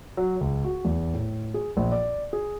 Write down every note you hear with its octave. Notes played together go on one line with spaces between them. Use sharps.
F#3
C#2
F#4
E2
A2
G#4
A#1
D5
G#4